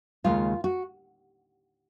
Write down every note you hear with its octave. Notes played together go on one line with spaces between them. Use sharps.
D#2 C#3 G#3 D#4 F4
F#4